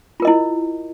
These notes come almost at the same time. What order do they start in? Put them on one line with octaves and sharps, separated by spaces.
F4 A#4 D#5 E4